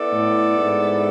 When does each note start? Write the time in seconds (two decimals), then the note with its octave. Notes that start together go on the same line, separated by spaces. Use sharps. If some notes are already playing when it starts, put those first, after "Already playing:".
Already playing: B3 E4 A4 D5
0.13 A2
0.58 G#2